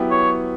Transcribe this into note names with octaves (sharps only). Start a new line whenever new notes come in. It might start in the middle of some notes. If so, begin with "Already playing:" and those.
Already playing: F#3 B3 E4 G4
C#5